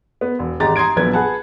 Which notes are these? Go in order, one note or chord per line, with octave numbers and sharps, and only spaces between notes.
B3
E1
G#1 G#3 G4 A#5 A6
A#5 C6 D#6 G#6 D7
A#1 F#3 B3 G#6
G#4 B4 F#5 A5